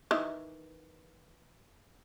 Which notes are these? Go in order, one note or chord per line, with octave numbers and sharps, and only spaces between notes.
D#3 E3